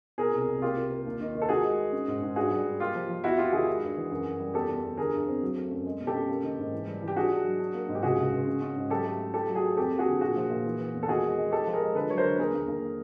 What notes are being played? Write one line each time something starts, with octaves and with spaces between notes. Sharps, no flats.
B2 G#4 A#4
C2
C2
A#3 F4 G4
A#3
A#3
D#2
D#3
D#3
A4
D#3 F#4 G#4
G#3
G#3
C#4
G#2
G#2
G2 F#4 G#4
G3
G2
A#3 F4 G4
F3
F3
E2 E4 F#4
E2 F4 G4
D#3 F#4 G#4
G#3
G2
E3
F#2
F#2
G3
E2 G4 A4
E2
E2
D3 G#4 A#4
G2
C4
F#3
A3
F#2
G#3
B2
G4 A4
C#4
A#3
D#3
G#2
E3
G3
E3
G4
D4 F#4 G#4
D4
F#3
D4
A#3
G#2
G4
C#2 F#4 G#4
C#2
C#2
C#4
C#4
G#2
F#3 G4 A4
A3
A3
A3 G4 A4
F#3
F#4 G#4
A3
F2 G4 A4
A#3
F#4 G#4
D3
A#2 F#4 G#4
F3
A#2
E3
E3
E2
A4
D#3 F#4 G#4
G#3
G#3
G#3 G4 A4
F3
G#4 A#4
G#3
D3 A4 B4
F#3 C#5
A#4 C5
D3
B4
D#2 G#4 A#4
D#2
D#2